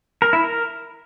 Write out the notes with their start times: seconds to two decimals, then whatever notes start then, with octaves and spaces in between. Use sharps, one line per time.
0.22 A#4
0.33 E4
0.44 A#4